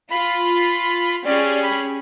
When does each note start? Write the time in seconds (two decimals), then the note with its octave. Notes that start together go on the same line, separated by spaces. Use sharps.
0.10 F4 B5
1.25 C#4 G4 G#4 D5
1.62 B5